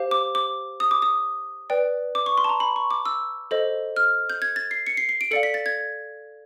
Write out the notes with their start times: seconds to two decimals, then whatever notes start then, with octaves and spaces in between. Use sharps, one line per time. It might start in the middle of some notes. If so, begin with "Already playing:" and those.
Already playing: G4 C5 F5
0.11 D6
0.35 D6
0.80 D#6
0.91 D6
1.02 D#6
1.70 B4 D5 G5
2.15 D6
2.26 C#6
2.38 C6
2.44 A5
2.49 A#5
2.60 B5
2.76 C#6
2.91 D6
3.06 E6
3.51 A4 C5 D#5
3.96 F6
4.30 G6
4.42 G#6
4.56 A6
4.71 C7
4.87 C#7
4.97 C7
5.09 C7
5.21 D7
5.31 A4 D5 F5 C#7
5.43 B6
5.54 A6
5.66 G#6